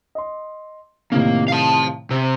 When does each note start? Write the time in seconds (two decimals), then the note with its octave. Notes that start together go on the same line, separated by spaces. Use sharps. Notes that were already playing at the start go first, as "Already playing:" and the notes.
0.15 D#5 C6
1.12 A2 C3 D#3 A#3
1.48 F5 A5
2.11 C3